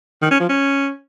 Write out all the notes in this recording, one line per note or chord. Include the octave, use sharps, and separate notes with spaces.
D#3
C#4
F3
C#4